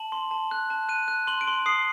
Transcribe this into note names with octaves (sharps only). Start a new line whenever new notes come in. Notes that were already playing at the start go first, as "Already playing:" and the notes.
Already playing: A5 F#7
C6
A5
F#6
A5
F#6 D#7
F#6
C6 F#7
D7
C6
D#6 C7